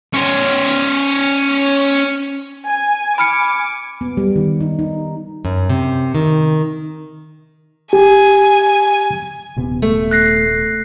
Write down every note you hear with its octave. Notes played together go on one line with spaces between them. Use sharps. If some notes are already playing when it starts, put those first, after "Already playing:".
C#4 C5
G#5
G#5 B5 D6 F6 C#7
B3
G3
D#3
D#4
D#4
F#2
C3
D#3
G4 G#5
D#1 C3 B3
A3
F#6 A#6 C7